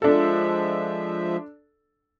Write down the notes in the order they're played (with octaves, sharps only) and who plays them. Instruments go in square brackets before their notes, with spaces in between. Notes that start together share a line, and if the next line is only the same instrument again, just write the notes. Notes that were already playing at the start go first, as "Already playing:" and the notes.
[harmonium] F3 G#3 E5 [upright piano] D4 A4